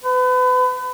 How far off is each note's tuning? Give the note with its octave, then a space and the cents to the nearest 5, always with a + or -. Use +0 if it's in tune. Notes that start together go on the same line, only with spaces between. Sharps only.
B4 +35